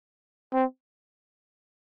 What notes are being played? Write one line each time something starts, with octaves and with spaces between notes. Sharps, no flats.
C4